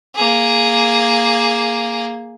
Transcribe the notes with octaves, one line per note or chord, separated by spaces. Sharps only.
A#3 G#4